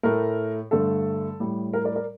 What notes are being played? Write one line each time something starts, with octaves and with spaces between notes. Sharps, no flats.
A2 A3 A#4
G2 D3 A3 A4
A2 G3
A#4
A#4 D5
A#4 D5